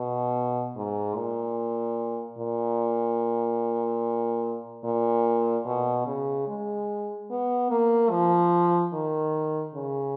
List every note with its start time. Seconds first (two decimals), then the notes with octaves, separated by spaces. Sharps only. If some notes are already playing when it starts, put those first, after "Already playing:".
Already playing: B2
0.76 G#2
1.16 A#2
2.39 A#2
4.84 A#2
5.66 B2
6.07 C#3
6.48 G#3
7.30 B3
7.71 A#3
8.11 F3
8.93 D#3
9.75 C#3